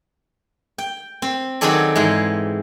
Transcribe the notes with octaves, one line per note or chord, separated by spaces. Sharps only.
G5
C4
D#3 F#3 C4 G#4 A4 D5
G#2 E3 G#3